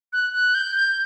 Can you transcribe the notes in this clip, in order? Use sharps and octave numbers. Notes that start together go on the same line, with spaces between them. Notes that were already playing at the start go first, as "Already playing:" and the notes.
F#6
F#6
G6
G6